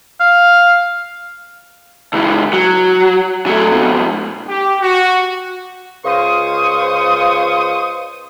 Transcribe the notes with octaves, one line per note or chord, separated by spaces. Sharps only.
F5
C#2 E3
F#3
F#3 A3
F2 B2
G4
F#4
C#2 F4 C5 C#6 D#6